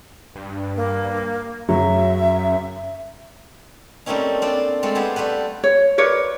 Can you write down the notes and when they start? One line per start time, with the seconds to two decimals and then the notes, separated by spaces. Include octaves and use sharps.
0.36 G2
0.76 A#3
1.69 F#2 C#3 F#3 E5
4.06 G3 A3 A#3 C4 C#4 D#4
4.42 C4 D4 F4 D5
4.83 G#3 A3 C4 F4 A4
4.95 B3 G4 G#4 C5
5.16 G3 A3 G4 B4
5.64 C#5
5.98 A#4 B4 C#5 D5